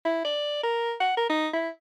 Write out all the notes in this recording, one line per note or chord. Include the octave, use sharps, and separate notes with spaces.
E4
D5
A#4
F#5
A#4
D#4
E4